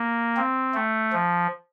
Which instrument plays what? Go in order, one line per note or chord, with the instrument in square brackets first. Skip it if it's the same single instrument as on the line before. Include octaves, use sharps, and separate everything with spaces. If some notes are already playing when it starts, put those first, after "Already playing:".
Already playing: [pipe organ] A#3
C4
A3
F3